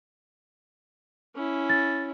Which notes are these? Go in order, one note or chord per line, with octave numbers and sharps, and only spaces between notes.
C#4 E4
A6